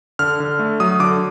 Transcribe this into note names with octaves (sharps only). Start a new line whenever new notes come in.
D3 F6
D3
A3
F#3 D#6
D3 D6